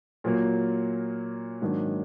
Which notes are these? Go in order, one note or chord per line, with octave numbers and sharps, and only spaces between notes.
A#2 F#3 A#3
G#2 D#3 F#3 A#3 D4